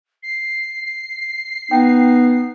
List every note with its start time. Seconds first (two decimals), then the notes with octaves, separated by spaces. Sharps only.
0.22 C7
1.71 B3 D#4 G5